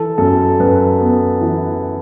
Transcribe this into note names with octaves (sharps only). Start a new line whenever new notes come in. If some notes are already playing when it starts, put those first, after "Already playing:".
Already playing: E3 A4
F#2 A4
F#2 B4
B3
E3